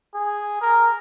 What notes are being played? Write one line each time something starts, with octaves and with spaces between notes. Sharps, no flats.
G#4
A#4